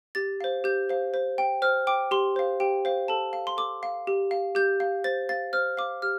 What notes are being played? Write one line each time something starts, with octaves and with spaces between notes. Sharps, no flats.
G4 A6
C5 F5
G4 G6
C5 F5
C5
G5
C5 F6
G5 D6
G4 C6
C5 F5
G4 G5
C5 F5
A4 A5
F5
C6
A4 D6
F5
G4
F5
G4 G6
F5
C5 A6
F5 A6
C5 F6
F5 D6
G4 F6